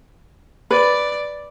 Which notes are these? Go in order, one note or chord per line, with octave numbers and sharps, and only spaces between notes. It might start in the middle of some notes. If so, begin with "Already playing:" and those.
B4 D5